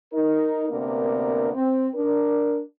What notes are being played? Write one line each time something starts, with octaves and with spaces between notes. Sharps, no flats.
D#4 A#4
D2 C3 A#3 B3 D4 A#4
C4
D4 A#4